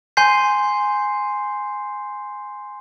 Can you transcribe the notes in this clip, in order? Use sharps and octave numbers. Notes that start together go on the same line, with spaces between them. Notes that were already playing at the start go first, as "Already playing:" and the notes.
G#5 C6 G6 C7